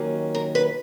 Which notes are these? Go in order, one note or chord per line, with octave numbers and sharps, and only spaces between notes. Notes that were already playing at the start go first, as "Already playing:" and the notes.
Already playing: D#2 D#3 F#3 A#3 C#4
A#4
B4